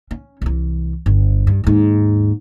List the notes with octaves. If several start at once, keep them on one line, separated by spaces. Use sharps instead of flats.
C#4
C2 E3
G1
G2
D#2 G#2